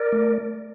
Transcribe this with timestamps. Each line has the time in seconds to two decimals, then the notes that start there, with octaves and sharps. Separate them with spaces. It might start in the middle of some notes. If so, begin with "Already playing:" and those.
Already playing: A#4 D5
0.12 A3